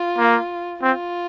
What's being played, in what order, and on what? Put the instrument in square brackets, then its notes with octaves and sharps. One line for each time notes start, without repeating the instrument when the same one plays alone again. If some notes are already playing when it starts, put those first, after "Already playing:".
Already playing: [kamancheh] F4
[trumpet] A#3
[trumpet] C4 [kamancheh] F4